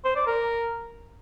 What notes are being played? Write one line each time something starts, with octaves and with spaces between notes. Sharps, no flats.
C5
D5
A#4